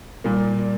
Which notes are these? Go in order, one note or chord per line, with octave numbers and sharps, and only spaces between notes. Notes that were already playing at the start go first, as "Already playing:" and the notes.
A#2 G3 A#3